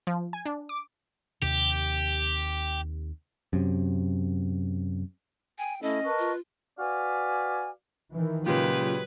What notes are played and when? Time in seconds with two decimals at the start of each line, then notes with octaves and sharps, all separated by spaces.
0.07 F3
0.33 G#5
0.46 D4
0.69 D6
1.42 D#2 C3 G4
3.53 F#2 C3
5.58 G5 G#5
5.82 A3 C#4 E4 A4 D#5
6.05 A#4 B4 A5 C#6
6.19 F4
6.79 F#4 B4 D5 F5 G#5
8.12 D#3 E3
8.46 A#2 C#3 F#3 G#3 F4 G4 B4